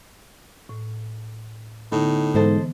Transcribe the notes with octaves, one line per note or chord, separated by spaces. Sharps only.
A2
A2 D3 B3 D#4
G#2 E3 B3 A4 C5 D#5